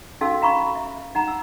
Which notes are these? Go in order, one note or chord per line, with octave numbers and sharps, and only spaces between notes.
C#4 D#4 F#4 A4 F5 E6
F5 A#5 B5 C#6
E5
D#4 F#5 A#5
E6